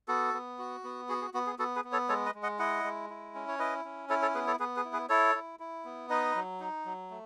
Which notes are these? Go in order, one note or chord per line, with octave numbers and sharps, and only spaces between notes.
B3 F#4 A4
B3
F#4
B3
F#4 G#4
G#4
B3 F#4
G#4
B3 F#4 A4
G#4 B4
B3
A4 C#5
G#3 A4 C#5
B4 D#5
G#3
D#5 F#5
E4 D#5 F#5
G#3
E4
C#4
C#5
E4 B4 D#5
C#4
E4 A4 C#5
A4 C#5
B3 G#4 B4
A4 C#5
B3 G#4 B4
G#4 B4
E4
G#4 B4
E4 A4 C#5
E4
E4
B3
D#4 B4 D#5
F#3
D#4
F#3
A3